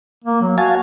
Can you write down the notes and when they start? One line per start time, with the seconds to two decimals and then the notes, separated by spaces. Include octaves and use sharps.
0.24 A#3
0.41 F#3
0.58 F#4 F5 G#5 A5